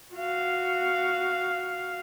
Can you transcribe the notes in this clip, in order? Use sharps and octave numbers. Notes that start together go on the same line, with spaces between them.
F#4 F5